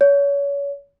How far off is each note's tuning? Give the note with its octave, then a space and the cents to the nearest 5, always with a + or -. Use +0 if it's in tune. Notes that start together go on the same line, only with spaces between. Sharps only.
C#5 +30